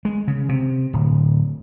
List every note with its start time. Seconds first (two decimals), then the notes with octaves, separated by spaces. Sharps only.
0.05 G#3
0.28 C#3
0.49 C3
0.93 D1